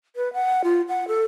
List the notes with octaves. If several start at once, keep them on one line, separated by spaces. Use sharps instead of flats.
B4
F#5
F4
F#5
A4